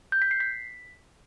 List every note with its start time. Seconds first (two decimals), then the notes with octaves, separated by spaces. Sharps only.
0.12 G6
0.22 B6
0.31 C7
0.40 B6